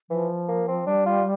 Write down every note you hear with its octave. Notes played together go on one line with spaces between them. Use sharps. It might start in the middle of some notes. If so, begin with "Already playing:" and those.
E3 F3
A#3
C4
G3 D4
F4